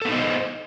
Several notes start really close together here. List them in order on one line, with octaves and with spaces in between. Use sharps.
A4 B3 D#4 D#5 C5